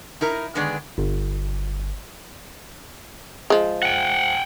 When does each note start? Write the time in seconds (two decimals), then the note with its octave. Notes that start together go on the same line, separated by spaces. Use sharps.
0.21 D#4 E4 A#4
0.55 D3 D#3 G#3 B3 G#4 D5
0.98 G1
3.50 F3 G#3
3.83 F#5 G5